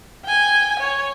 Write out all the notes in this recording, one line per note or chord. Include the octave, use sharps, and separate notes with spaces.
G5 G#5
C#5